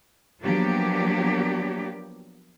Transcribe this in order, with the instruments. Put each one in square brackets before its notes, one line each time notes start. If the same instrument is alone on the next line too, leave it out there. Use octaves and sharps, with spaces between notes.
[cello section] F3 F#3 A#3 B3 D4 G4